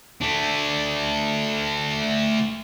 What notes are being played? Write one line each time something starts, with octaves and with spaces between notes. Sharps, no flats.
A3 D4